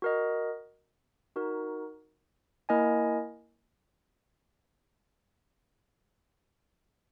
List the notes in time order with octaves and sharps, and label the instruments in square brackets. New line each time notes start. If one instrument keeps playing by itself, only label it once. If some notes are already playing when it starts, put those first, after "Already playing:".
[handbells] F#4 A#4 D#5
D#4 F#4 A#4
A#3 E4 A#4 D#5 G#5